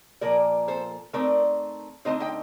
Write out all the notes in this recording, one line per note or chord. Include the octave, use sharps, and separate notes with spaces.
A#2 F3 A#3 A#4 D5
A4 C5
D#3 A3 C4 A#4 D5
D3 A3 C4 D#4 C5 D#5
D#5 G5